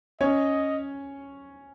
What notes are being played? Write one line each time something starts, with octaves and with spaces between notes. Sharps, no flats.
C#4 C#5 D#5